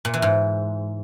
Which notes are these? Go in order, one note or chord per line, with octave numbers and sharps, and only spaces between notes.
A#2
E3
G#2